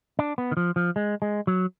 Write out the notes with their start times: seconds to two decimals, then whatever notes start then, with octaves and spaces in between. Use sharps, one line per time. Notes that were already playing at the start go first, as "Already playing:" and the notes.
0.19 D4
0.38 B3
0.51 D#3
0.57 F3
0.76 F3
0.96 G#3
1.22 G#3
1.47 F#3